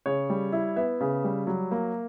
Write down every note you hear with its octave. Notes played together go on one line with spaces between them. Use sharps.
C#3 C#5
G3
E4
B3 E5
C#3
G3
F#3
A#3